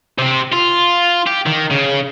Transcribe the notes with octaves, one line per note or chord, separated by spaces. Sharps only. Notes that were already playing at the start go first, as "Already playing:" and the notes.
C3 C4
F4
G4
D#3
C#3